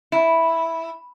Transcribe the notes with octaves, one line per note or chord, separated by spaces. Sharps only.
E4